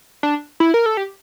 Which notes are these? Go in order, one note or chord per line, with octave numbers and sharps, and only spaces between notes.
D4
E4
A#4
A4
G4